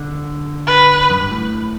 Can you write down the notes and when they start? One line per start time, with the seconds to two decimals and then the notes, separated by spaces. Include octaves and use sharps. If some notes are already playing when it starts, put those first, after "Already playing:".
Already playing: D3
0.67 B4
1.10 F#2
1.20 G2
1.31 A2